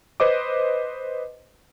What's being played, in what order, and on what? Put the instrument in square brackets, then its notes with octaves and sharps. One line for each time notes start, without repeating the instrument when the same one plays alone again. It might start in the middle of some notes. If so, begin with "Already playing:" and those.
[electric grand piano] B4 C5 D#5 D6